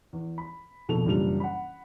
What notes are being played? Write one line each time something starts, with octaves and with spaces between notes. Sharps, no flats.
E2
B5
A#1 F2 B2 A4 F7
F#1 A#2 E3 G3 D4 F7
F#5 B5